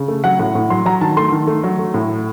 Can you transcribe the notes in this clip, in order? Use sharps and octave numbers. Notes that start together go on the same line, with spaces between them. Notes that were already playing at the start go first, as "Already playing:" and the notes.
Already playing: C#3
A3
F#3 F#5
A2 F#5
A2
F#3 C6
F#3 A#5
D#3 A5
A3 C6
D#3
A3
F#3
A3
A2